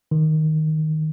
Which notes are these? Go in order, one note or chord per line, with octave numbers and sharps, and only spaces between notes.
D#3